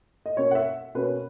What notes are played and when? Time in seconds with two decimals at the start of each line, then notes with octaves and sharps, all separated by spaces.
0.26 D#5
0.36 B2 A#3 C#4 C#5
0.51 F#5
0.55 E5
0.95 B2 A#3 C#4 B4